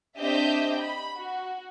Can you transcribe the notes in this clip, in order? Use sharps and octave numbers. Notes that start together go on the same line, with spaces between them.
C4 D4 G4 D#5 E5 G6
B5
F#4